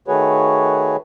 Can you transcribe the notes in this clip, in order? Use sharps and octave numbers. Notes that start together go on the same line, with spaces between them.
D#3 A3 F#4 G#4 B4 C#5